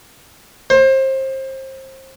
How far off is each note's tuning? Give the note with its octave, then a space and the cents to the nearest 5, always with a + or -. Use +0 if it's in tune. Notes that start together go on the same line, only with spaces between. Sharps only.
C5 +30